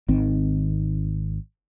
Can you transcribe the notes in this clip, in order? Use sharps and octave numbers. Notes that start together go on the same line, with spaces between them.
G#1 D#3 C4